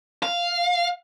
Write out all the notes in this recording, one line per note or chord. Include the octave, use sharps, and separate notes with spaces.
F5